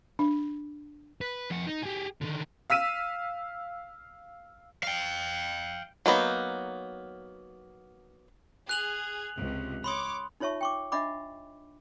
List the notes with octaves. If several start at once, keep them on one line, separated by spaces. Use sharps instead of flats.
D4
B4
F2 F#5
D#4
G4 G#4
D3 D#3
F5 E6 B6 D#7 E7
F5 G5
F#3 A#3 B3 D#4
G#4 F#6 F7 F#7
C#2 C3
C#5 B5 C6 D6 D#6
D#4 F4 C#5 E5 A5 C#6
G5 C#6 D6
D4 D#5 E5 F#5 B5 D6